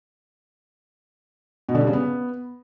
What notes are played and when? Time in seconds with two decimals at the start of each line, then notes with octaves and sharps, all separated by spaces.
1.69 B2
1.75 D3
1.81 G3
1.87 C#3
1.93 B3